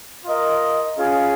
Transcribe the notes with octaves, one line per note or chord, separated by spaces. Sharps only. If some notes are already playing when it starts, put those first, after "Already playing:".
F4 A#4 D#5
C#4 F4 G#4